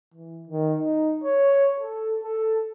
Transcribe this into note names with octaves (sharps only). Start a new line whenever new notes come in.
E3
D#3
D#4
C#5
A4
A4